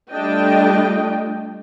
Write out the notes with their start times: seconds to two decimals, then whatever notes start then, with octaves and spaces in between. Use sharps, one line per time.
0.12 G3 A3 D4 F4 D#5 G5